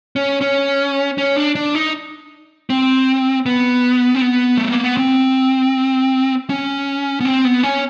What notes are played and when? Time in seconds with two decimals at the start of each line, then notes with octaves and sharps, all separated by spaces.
0.16 C#4
0.41 C#4
1.18 C#4
1.36 D4
1.55 D4
1.75 D#4
2.70 C4
3.46 B3
4.15 C4
4.21 B3
4.58 A3
4.71 A#3
4.84 B3
4.97 C4
6.50 C#4
7.20 B3
7.25 C4
7.45 B3
7.63 C#4